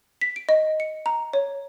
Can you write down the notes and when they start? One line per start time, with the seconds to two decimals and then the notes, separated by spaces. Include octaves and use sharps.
0.21 B6
0.36 D7
0.49 D#5
0.80 C#7
1.06 A#5
1.33 C#5